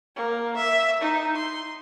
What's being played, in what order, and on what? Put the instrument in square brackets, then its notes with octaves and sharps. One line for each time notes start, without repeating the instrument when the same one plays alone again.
[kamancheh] A#3
E5
D#4
C6